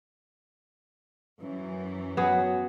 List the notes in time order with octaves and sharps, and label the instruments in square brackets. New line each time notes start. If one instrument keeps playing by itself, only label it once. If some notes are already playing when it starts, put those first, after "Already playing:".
[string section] F#2 E3
[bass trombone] F#3 [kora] B3 F#4 G#4